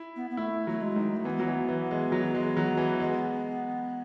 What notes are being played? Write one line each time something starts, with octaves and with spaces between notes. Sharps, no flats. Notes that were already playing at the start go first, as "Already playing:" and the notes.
Already playing: E4
B3
B3
A3 E4
F#3 A3
G#3
D#3
A3
E3 B3
F#3
E3
E3
G#3
F#3
G#3
F#3
E3
G#3